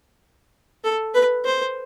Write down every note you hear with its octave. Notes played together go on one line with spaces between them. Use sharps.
A4
B4
C5